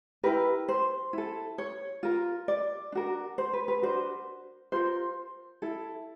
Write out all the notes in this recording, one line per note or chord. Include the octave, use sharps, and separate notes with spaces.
E4 G4 A#4 B4
C5
E4 A4
C#5
F4 A#4
D5
D4 F#4 A#4
C5
B4
B4
D4 F#4 A#4 C5
F4 A#4 C5
E4 A4